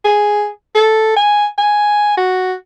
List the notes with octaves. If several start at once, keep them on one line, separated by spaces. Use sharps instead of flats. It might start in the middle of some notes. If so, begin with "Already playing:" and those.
G#4
A4
G#5
G#5
F#4